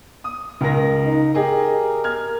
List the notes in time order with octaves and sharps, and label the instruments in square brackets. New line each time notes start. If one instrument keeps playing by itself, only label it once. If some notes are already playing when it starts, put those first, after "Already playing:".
[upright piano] D#6
C#2 A#4 A#6
[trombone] D#4
[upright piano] G4 G#4 D#5 [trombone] A#4
[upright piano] F6 G#6